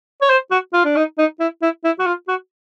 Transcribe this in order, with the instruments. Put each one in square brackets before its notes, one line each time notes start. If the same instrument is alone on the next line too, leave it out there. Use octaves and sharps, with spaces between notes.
[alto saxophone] C#5
C5
F#4
F4
D4
D#4
D#4
E4
E4
E4
F#4
F4
F#4